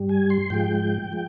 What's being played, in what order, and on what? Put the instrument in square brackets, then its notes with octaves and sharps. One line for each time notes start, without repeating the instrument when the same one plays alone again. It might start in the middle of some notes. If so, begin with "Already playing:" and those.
Already playing: [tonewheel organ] G2 G3
G#5
C6
G#2 F3 G#3 G5
F3 G#3